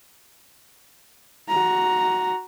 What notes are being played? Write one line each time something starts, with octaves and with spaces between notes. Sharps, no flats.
F#4 A#5